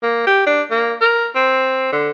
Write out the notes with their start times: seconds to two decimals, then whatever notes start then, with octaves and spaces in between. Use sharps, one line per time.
0.02 A#3
0.27 G4
0.46 D4
0.71 A#3
1.01 A#4
1.35 C4
1.92 D3